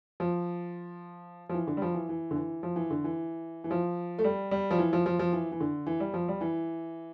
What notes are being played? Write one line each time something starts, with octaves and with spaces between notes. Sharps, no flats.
F3
F3
E3
D3
G3
F3
E3
E3
D3
E3
F3
E3
D3
E3
E3
F3
A3
G3
G3
F3
E3
F3
F3
F3
E3
E3
D3
E3
G3
F3
G3
E3